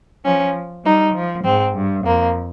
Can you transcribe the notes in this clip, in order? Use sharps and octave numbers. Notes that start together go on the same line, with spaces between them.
F3 C#4
G3 D#4
F3
G#2 C4
G2
F2 A#3